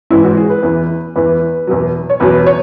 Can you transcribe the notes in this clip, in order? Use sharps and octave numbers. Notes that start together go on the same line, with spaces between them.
G#2 E3 E4
F#4
G#4
B4
E2 E3
E2 E3 B4
E2 B2 F#3
C#5
E2 B2 F#3 B4
C#5